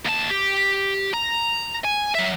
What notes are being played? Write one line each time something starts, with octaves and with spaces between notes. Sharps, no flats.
D#2 A5
G4
A#5
G#5
F#3 E5